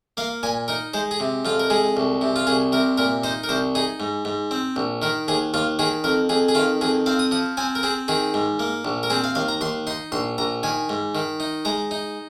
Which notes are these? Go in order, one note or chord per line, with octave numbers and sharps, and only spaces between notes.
A#3 F5
A#2 G#5
D#4 A#4
G#3 C5
G#4
C3
F2 F4
A#4
G#3 G#4
C2
C3
F4
C2 G#4
C3 A#4
A#2 A#4
D#4 C5
A#4
C2 C5
D#4 G#4
G#2
G#2
C4
A#1
D#3 A#4
D#2 G#4
D#2 F4
D#3 G#4
F2 A#4
F2 G#4
G#4
D#3 F4
F2 G#4
C4 F5
D#6
F3 D#6
C4 G#5
A#4
C4 G#4
D#3 G#4
G#2
A#3
A#1
A#4
C4 G#4
F5
D#2 F5
A#5
D#2 C6
D#4 C6
A#1 C6
A#1 A#5
D#3 G#5
G#2
D#3
D#4
G#3 A#5
D#4